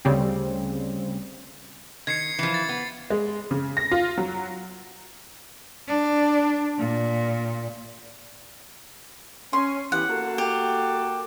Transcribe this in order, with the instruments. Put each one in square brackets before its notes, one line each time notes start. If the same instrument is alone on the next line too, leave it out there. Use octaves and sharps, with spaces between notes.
[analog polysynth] D2 C#3 G3 C4
[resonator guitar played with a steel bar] D#3 [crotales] G#6 C7 C#7
[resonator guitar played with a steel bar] E3 F3
[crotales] A6
[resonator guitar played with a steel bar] B3
[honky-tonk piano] G#3
C#3
A#6
F4
F#3
[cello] D4
A#2
[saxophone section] C#4 [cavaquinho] C6
[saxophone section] E3 B3 G4 [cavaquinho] F#5
[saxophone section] A#3 F#4 A4
[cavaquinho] G4